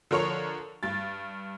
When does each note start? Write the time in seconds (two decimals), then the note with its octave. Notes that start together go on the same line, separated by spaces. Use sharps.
0.11 D3 F3 A#4 C#5 C#6 F7
0.83 G2 A6